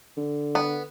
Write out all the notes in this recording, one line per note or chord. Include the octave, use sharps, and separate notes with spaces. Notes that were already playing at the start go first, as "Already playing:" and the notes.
D3
B3